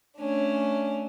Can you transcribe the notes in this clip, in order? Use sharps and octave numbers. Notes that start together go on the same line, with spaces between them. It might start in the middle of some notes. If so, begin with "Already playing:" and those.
A3 C#4 D4